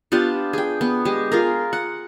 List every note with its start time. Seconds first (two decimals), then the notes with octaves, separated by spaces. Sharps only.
0.12 B3 D4 F4 G4
0.53 G#4 G5
0.81 B3
1.05 G#3 G4
1.32 F4 G#4 A#4
1.73 F#5